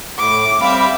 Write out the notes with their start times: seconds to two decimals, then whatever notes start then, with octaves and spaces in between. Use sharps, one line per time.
0.18 A2 D6
0.60 G3 C4 E5 F5 B5